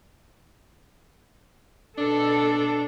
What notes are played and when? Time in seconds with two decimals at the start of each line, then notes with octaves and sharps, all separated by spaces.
1.98 B2 D4 A4